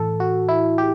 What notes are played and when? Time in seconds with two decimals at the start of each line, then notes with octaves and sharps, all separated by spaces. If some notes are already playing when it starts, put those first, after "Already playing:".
Already playing: A2 E3 A4
0.20 F#4
0.49 E4
0.78 G4